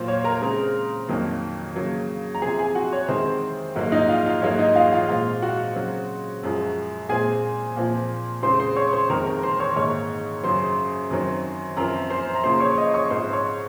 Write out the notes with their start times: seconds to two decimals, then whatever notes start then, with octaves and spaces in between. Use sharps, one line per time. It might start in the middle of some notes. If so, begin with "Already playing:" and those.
Already playing: A#2 F#3 A#3 F4 C5
0.08 C#5
0.24 A#4 A#5
0.42 C#3 G#3 C4
1.09 F2 D#3 F#3 A#3
1.75 C#3 F#3 A#3
2.35 A#5
2.42 C3 F3 C4 G#4 G#5
2.59 G#4 G#5
2.75 F#4 F#5
2.93 C#5
3.08 C3 D#3 G#3 C4 C5
3.76 G#2 F#3 A#3
3.92 D#4 D#5
4.09 F4 F5
4.25 F4 F5
4.42 G#2 F#3 A#3 C#5
4.59 D#4 D#5
4.76 F4 F5
4.92 F4 F5
5.09 A#2 G#3 C4 F4 F5
5.42 F#4 F#5
5.75 C#3 F#3 C4
6.43 F#2 F3 G#3
7.09 A#2 G#3 C4 G#4 G#5
7.76 A#2 F3 C4
8.43 C#3 G#3 C4 C5 C6
8.59 C5 C6
8.76 C#5 C#6
8.93 C5 C6
9.10 F2 D#3 G#3 C4 A#4 A#5
9.26 A#4 A#5
9.43 C5 C6
9.59 C#5 C#6
9.76 G#2 D#3 A#3 C#5 C#6
10.43 F#2 C#3 F#3 C5 C6
11.10 F#2 D#3 F#3 C4
11.76 F#2 F3 C4 A#4 A#5
12.10 C5 C6
12.35 A#5
12.44 C#3 F3 A#3 C5 C6
12.60 C#5 C#6
12.77 D#5 D#6
12.94 C#5 C#6
13.10 G#2 F3 C4 C5 C6
13.33 C#5 C#6